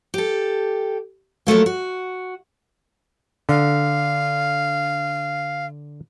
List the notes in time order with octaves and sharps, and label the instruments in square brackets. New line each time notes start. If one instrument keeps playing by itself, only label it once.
[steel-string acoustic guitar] G4 A4
F3 F#3 A3 A#3
F#4
[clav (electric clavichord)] D3 [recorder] F5